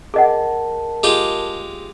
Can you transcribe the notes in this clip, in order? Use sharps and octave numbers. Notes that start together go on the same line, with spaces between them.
G#4 A#4 D#5 F#5 A5
G#3 F4 G4 G#4